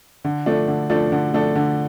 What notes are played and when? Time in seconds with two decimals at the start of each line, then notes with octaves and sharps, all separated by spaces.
0.25 D3
0.46 F3 A3 D4 A4
0.68 D3
0.90 F3 A3 D4 A4
1.12 D3
1.33 F3 A3 D4 A4
1.56 D3